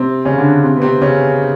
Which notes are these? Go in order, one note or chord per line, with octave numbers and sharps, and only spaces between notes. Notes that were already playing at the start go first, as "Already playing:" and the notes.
Already playing: C3 C4
C#3 C#4
D3 D4
C3 C4
B3
C3 C4
C#3 C#4